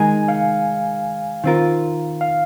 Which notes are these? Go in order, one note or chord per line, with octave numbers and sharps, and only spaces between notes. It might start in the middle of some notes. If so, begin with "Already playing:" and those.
Already playing: D#3 G#3 D#4 A#4 G#5
F5
D#3 C4 F4 A#4
F5